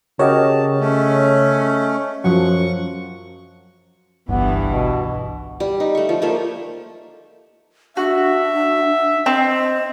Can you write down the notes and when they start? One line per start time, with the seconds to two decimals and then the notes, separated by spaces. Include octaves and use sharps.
0.19 C#3 F#4 G4 A#4 C#5 D#5 A5
0.80 A3 C#4
2.24 F#2 F3 F#3 F#5 C#6
4.29 G1 C2 G2 E3 B3
4.70 B2
5.60 G3
5.80 D#4
5.95 A3 C#6
6.09 F3
6.22 F3 A3 A#3 E5
7.97 D4 F#4 E5
9.26 C4 D#5